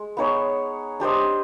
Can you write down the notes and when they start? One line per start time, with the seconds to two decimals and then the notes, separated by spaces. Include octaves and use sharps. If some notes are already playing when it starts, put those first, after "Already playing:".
Already playing: G#3
0.17 B3 D#4 G#4 C#5
1.00 D4 G4 C5 D#5